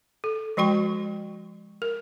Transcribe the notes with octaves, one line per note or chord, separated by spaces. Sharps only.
A4
F3 G#3 F#4 G5 C#6
A#4